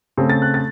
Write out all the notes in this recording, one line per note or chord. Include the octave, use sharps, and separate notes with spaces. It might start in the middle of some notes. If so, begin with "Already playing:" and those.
C#3 A3 C4
A6
F#6
A6